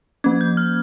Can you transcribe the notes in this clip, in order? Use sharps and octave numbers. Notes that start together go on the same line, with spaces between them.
F3 A#3 C#4 G#6
G6
F6